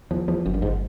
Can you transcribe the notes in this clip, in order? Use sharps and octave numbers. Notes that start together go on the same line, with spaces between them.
E2 F3
E2 F3
G1 F#2
G2
G1 G#2